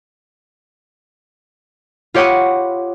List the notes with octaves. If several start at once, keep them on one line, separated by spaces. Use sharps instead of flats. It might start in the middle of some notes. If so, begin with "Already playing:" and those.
F4 G4 C#5 F#5 B5 D#6